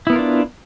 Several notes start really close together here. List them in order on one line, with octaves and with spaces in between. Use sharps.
E4 B3 A#4 F4 D4